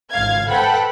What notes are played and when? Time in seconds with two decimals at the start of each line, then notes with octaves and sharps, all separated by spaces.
0.11 G#1 C#2 F5 G#6
0.49 A4 B4 C5 F#5 G5 B5